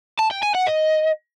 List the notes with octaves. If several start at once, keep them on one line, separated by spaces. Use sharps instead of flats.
A5
G5
G#5
F#5
D#5